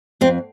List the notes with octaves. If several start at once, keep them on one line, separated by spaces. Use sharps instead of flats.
F2 C4